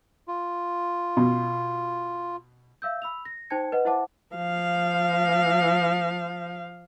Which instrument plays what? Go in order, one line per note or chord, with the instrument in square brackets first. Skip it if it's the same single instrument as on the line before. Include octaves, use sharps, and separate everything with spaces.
[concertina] F4
[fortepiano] B2
[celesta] E5 F5 E6 G6
B5 E6 F7
A#6
D#4 C5 G5 A5 G#6 C#7
B4 D#5 F#5
E4 C5 E5 F#5 A5 D6
[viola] F3 F5